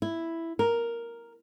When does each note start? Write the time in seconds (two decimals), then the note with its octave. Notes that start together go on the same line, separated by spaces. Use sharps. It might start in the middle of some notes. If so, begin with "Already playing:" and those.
0.02 E4
0.59 A#4